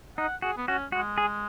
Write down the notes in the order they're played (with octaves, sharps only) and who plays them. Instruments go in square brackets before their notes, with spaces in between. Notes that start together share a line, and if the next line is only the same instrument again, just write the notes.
[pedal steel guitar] D#4 [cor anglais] F#5
[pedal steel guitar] F#4 [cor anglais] G#4
[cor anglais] B3
[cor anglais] C#4 [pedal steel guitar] F#4
[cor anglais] G#3 [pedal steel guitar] F#4
[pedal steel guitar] G#4